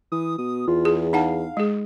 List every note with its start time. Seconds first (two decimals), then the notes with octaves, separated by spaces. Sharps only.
0.12 E3 D#6
0.38 B2 D#6
0.68 E2 F4
0.85 G#4
1.13 D#4 F5 F#5 A5
1.57 G#3 G#4